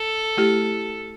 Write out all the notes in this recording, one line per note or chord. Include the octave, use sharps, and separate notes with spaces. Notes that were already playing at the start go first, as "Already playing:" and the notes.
Already playing: A4
A3 E4 G4